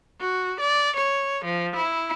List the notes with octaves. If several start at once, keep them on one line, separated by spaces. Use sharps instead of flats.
F#4
D5
C#5
F3
E4